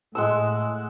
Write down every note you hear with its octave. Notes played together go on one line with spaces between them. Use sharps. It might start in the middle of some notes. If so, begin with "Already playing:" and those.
A2 G#3 F#5 E6